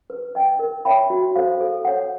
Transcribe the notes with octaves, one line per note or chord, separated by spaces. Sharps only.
B4
D#5 G5
A#4
C#5 E5 G5 B5
F#4
A4 C5 F5
A4
C#5 F#5